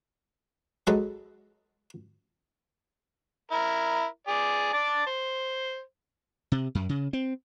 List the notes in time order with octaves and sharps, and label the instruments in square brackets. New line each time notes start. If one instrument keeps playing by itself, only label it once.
[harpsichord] F#3 G#3 A4 B4 D#5
[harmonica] E4 A#4
G#4 D5
D5 A5
C5
[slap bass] C3
F#2
C#3
C4